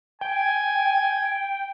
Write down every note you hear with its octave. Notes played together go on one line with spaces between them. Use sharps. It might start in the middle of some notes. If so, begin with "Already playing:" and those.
G5 G#5